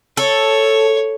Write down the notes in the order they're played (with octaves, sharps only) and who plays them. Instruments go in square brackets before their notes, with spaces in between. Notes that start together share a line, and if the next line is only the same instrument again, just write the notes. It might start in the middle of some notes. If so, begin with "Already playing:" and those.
[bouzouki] A4 [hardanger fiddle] C#5